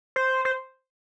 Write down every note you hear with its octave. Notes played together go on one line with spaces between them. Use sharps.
C5
C5